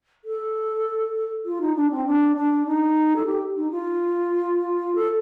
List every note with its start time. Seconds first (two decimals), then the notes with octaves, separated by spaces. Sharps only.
0.25 A4
1.45 F4
1.61 D#4
1.76 D4
1.91 C4
2.06 D4
2.36 D4
2.66 D#4
3.16 A4
3.26 G4
3.56 D#4
3.71 F4
4.95 A4